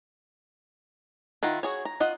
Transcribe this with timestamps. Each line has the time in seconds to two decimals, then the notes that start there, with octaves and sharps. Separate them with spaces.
1.43 D#3 E4 F4 F#5 A#5
1.63 F#4 G#4 C#5
1.85 A#5
2.00 F4 D#5 F#5